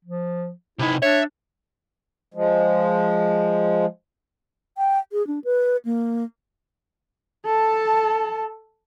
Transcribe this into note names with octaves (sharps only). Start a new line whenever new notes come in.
F3
C3 D#4 E4
D4 C#5 E5
F3 G#3
G5
G#4
D4
B4
A#3
A4 A5